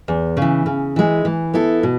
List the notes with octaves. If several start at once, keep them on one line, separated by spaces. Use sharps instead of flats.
E2
C#3
E3
C#3
E3 G#3
E3
B3 E4 A4
B2